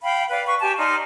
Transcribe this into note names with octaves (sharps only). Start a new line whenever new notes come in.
F5 G5 B5
B4 D5 F5
B4 C#6
G4 G#5 A5
D#4 D5 C6 F6